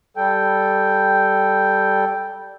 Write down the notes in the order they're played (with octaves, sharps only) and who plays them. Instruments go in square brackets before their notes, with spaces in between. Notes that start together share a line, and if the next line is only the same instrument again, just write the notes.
[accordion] G3 A4 G5